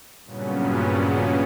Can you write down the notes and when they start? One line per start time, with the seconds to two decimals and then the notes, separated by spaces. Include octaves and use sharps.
0.24 G2 A#2 C#3 F#3 B3 C#4